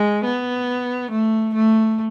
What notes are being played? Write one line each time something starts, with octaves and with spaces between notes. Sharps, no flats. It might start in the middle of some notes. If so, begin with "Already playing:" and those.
Already playing: G#3
B3
A3
A3